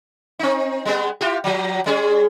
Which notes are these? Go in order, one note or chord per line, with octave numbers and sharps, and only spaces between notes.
C4 D#4
G3 G#3 B3
E4 F4 G4
F3 F#3
G3 C#4 G#4